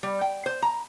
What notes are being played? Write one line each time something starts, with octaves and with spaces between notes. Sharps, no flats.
G3
G5
C5
A#5